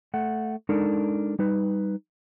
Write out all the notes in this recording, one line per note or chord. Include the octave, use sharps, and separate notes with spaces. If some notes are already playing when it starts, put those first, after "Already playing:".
A3 F#5
G#3 D4 D#4 A4 A#4
G3 D#4 B4